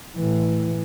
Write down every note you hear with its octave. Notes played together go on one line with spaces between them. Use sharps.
A2 E3